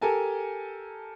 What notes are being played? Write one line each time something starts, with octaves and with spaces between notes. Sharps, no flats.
G4 A4 A#4 G#5 A5